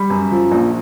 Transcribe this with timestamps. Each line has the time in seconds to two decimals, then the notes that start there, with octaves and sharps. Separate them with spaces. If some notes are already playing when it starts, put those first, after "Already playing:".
Already playing: G3 B5
0.10 F#2
0.31 F3
0.52 A#1